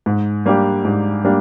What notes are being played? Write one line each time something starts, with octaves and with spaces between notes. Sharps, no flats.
G#2
G3 A#3 D4 G4
G#2
G3 A#3 D4 G4